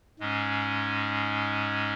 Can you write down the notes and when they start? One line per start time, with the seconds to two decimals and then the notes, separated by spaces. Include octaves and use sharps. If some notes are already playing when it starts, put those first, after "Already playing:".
0.20 G#2 G#3 C#4